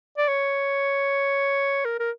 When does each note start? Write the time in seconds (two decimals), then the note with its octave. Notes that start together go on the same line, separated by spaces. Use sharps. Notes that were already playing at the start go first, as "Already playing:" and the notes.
0.18 D5
0.28 C#5
1.85 A#4
2.00 A#4